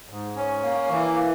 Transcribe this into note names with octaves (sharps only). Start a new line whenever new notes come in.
G#2
C#4
A#3
E3